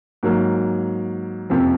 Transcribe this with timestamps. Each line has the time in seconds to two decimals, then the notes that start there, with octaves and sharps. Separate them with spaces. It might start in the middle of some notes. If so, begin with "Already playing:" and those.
0.23 G#2 F#3 A#3
1.50 F#1 F2 C3 F3 C4